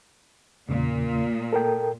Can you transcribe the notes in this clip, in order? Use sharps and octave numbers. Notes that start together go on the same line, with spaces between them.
E2 A#2 C#3
A4 A#4 G5